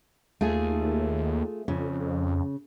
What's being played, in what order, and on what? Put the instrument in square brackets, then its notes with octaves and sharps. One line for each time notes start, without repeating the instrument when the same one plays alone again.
[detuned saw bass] D#2 [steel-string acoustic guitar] A3 F4 G#4
[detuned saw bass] F2 [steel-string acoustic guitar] C#3